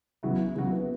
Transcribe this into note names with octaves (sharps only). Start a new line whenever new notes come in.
C#3 F#3 B3 E4 F#4
C#3 F#3 B3 E4 F#4
B3